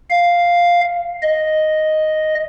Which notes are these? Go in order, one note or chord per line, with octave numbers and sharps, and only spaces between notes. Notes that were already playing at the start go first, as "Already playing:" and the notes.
F5
D#5